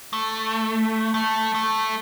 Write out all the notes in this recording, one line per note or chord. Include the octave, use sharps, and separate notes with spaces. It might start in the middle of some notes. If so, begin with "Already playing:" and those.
A3
A3
A3